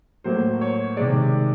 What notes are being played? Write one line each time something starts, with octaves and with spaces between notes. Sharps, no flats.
A2 F#3 A#3 C5
C#5
C3 D#3 G#3 D5